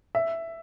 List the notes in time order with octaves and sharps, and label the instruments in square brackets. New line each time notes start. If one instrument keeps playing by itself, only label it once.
[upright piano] E5